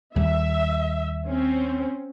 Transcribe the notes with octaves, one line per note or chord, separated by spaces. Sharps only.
D#2 G3 E5
C4 C#4